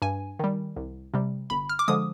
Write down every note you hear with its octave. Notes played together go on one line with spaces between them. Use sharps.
G2 G#5
D#3 G3
C2
C3 G3
G1 B5
F6
D6
D3 F3 G#3 D#6